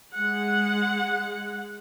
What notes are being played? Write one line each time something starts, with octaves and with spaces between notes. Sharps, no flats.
G#3 F#5